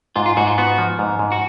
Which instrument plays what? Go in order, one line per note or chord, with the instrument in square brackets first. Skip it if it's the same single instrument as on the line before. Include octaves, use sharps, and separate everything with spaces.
[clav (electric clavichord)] G#2 [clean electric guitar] F4
[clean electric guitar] F4
[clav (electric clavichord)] G#2 [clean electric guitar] F#4
[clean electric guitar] F4
[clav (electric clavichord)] B3 [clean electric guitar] F#4
[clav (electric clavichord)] F3
G#2
G#2
[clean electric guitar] F#4